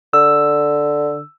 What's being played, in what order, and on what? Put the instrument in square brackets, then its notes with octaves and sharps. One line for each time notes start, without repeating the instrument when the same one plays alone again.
[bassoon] D3 [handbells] E6